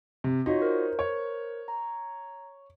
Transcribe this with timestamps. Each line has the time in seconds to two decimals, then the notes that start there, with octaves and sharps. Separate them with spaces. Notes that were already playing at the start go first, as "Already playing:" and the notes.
0.24 C3
0.46 D#4 F4 F#4 C#5
0.62 A#4 C5
0.99 C#5
1.68 A#5